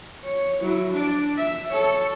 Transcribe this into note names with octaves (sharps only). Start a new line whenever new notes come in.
C#5
F#3 E4
D4 D5
E5
A4 C#5